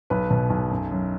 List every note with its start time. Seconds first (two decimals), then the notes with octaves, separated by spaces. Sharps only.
0.10 B1 B4
0.30 B2
0.50 B1
0.70 F#2
0.91 F#2